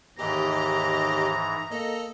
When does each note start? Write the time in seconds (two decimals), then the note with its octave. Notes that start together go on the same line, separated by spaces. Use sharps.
0.19 D#2 G#2 E3 G4 D#5 A#5
1.71 A#3 A4 D#5